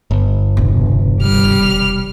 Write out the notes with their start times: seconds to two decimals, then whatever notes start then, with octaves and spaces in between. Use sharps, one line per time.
0.11 G1
0.57 E1 C3
1.20 G3 F6